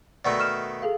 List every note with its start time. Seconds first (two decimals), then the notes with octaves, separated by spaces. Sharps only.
0.25 B2 D#3 A3 D5 C#6 E6
0.40 F6 E7
0.82 G#4 A4 F5